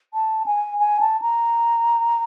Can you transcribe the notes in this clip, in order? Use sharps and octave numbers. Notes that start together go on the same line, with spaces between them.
A5
G#5
G#5
A5
A#5